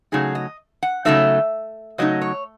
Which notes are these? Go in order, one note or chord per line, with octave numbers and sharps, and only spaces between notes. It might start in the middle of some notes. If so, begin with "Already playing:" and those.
C#3 F#3 A3 D#4 G#4
D#5
F#5
C#3 F#3 A3 D#4 E5
C#3 F#3 A3 D#4 D#5
C#5